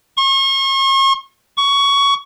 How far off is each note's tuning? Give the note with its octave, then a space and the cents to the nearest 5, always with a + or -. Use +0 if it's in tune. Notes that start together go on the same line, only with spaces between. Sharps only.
C#6 -40
C#6 +15